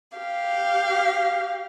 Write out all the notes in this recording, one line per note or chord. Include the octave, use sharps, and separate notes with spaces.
G4 F5